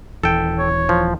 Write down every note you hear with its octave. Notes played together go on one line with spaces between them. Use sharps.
D#1 E3 A4 G5
C#5
F3